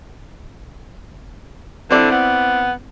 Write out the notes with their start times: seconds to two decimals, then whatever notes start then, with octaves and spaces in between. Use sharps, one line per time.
1.91 D3 C4 E4 D5
2.11 B3